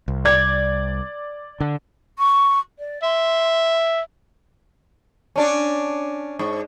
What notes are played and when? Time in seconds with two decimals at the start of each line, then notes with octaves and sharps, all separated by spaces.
0.08 C2
0.25 D5 G#6
1.60 D3
2.18 C#6
2.79 D5
3.02 E5 C6
5.36 C#4 D4 D5
6.39 G#2